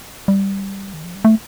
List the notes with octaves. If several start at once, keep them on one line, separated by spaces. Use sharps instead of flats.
G3
D#3
F3
G3
A3